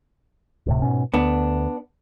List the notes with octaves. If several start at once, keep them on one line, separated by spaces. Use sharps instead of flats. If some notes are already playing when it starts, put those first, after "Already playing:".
D1 A2 C3
G#2 B2 C#4
D2 B3 D4